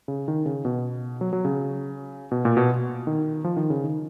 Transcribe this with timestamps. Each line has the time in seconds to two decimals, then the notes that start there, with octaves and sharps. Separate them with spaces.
0.08 C#3
0.28 D#3
0.46 C#3
0.65 B2
1.21 F#3
1.33 F#3
1.45 C#3
2.31 B2
2.45 A#2
2.57 B2
3.07 D#3
3.44 F3
3.57 D#3
3.70 C#3
3.84 D#3